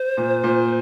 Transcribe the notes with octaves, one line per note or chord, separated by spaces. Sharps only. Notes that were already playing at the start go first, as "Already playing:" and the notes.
Already playing: C5
A#2
A#2